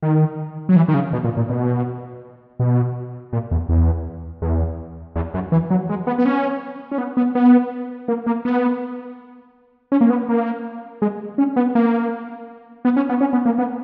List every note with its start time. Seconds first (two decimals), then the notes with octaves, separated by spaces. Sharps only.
0.03 D#3
0.69 F#3
0.76 E3
0.88 D#3
0.94 C#3
1.13 B2
1.24 A#2
1.37 A#2
1.49 B2
2.60 B2
3.33 A#2
3.51 E2
3.69 E2
4.42 E2
5.16 E2
5.34 F#2
5.52 E3
5.70 F#3
5.89 G#3
6.07 B3
6.18 B3
6.25 C#4
6.91 C#4
6.98 B3
7.17 B3
7.35 B3
8.08 A#3
8.26 A#3
8.45 B3
9.92 C#4
10.01 A#3
10.10 B3
10.29 A#3
11.02 G#3
11.38 C#4
11.56 B3
11.75 A#3
12.85 B3
12.96 C#4
13.09 B3
13.21 C#4
13.33 B3
13.45 A#3
13.58 B3